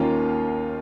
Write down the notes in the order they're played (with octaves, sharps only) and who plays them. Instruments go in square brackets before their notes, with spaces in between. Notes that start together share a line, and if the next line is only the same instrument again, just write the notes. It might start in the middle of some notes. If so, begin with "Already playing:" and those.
Already playing: [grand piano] D#2 D#3 A#3 C#4 F4